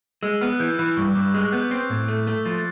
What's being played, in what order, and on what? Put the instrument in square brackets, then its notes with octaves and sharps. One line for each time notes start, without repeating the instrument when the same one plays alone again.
[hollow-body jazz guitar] G#3 [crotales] E6
[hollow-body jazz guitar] B3 [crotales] F6
[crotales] F#6
[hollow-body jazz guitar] E3 [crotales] G6
[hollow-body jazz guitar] E3 [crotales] F#6
[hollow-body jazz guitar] G2 [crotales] C#6
[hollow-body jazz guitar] G2 [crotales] D6
[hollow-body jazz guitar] G#3 [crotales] D#6
[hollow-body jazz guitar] B3 [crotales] G6
[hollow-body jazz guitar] C4 [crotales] G6
[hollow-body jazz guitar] A2
A3
A3
[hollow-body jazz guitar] F3 [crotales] A6